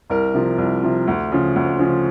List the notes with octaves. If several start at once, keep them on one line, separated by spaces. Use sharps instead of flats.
C2 A#4
C3 F3
C2
C3 F3
D2
C#3 F3
D2
C#3 F3